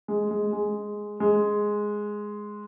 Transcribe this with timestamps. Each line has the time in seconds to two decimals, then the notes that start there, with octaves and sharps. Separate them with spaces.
0.08 G#3
0.31 G#3
0.53 G#3
1.20 G#3